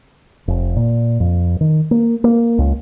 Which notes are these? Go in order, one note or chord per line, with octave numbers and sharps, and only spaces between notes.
F1
A#2
F2
D#3
A#3
A#3
C#2